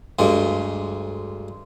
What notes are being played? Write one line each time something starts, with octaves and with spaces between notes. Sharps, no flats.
D2 G2 G#3